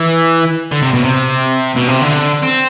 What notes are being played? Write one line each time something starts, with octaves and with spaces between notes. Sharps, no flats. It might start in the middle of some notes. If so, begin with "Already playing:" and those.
Already playing: E3
D3
C3
B2
C3
B2
C3
D3
C4